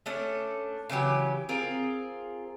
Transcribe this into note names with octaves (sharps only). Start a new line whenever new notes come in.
A3 C#4 D4 A4
C#3 E3 F#3 G4
C4 F4 G#4 A#4